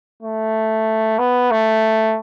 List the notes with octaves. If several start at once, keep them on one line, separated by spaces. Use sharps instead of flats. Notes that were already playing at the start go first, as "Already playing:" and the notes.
A3
B3
A3